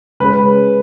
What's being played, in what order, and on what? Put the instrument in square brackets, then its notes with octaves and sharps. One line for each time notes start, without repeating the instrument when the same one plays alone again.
[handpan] C#3 G#3 C#4 G#4 [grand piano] B4